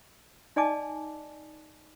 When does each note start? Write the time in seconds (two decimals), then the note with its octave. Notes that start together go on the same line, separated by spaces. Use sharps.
0.56 D#4 D5 D#5 G#5 A5 D6